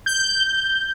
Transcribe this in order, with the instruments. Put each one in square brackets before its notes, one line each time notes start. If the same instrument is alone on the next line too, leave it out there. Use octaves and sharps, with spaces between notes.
[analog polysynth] G6